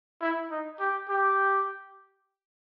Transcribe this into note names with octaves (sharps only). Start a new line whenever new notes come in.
E4
D#4
G4
G4